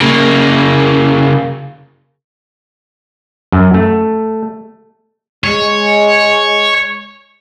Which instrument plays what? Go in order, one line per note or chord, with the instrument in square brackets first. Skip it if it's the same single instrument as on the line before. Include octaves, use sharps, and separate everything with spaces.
[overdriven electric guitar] C#3 A#3
[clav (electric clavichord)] F#2
A3
[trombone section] G#3 [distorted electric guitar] C#5